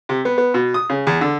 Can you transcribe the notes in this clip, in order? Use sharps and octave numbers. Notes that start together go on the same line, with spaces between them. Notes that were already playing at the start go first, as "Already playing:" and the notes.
C3
B3
B3
B2
D#6
C#3
E2
D3